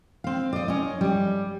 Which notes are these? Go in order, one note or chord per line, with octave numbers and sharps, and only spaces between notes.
C4 F5
D5 D#5
C#4 D#5
G3